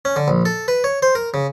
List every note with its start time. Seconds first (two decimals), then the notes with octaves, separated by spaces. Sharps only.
0.05 C#4
0.16 D3
0.28 A#1
0.45 A4
0.68 B4
0.84 C#5
1.02 C5
1.15 A#4
1.34 C#3